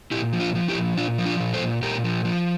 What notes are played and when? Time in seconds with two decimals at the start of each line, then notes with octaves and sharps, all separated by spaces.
0.11 A#2 E4 G4
0.33 F3
0.40 D4 F4
0.55 F3
0.68 E4 G4
0.75 A#2
0.97 A#2 D4 F4
1.18 F3
1.25 D4 F4
1.40 A#2
1.54 A4 C5
1.61 A#2
1.82 A#2 G4 A#4
2.04 F3
2.25 F3